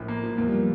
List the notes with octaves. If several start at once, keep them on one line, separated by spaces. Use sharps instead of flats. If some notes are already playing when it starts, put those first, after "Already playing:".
Already playing: A#1 A2
A#3
F3
E2 A#3
G3
F3